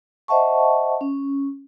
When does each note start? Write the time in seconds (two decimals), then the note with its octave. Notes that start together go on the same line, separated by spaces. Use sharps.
0.28 C5 D#5 E5 F#5 A5 C#6
1.01 C#4